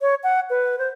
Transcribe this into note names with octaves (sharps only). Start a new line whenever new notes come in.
C#5
F#5
B4
C5